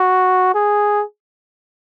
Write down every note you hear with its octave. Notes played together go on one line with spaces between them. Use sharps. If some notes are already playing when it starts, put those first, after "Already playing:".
Already playing: F#4
G#4